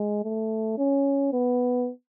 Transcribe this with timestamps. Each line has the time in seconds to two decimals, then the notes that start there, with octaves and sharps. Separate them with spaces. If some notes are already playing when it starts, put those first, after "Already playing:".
Already playing: G#3
0.24 A3
0.78 C#4
1.33 B3